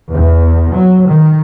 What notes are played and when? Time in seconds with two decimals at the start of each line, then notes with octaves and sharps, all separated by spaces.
0.12 E2
0.74 F#3
1.10 D#3